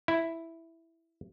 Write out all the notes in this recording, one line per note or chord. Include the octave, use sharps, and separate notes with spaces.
E4